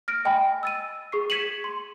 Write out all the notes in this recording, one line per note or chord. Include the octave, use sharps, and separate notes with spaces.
F6 A#6 D7
D#5 G5 G#5 B5
E6 A6 D#7
G#4 C#6 C7
G#6 B6 C#7 D#7 E7 F#7
C6